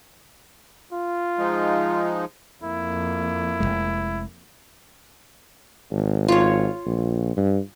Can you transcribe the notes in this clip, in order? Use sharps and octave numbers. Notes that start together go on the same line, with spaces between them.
F4
F3 G#3 D#4
F2 A#3 E4
F1 D#2 G#3
G#1
F4 C#5
A#1
G2